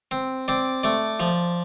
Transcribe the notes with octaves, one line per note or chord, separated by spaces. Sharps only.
C4
C4 D5
A3 D5
F3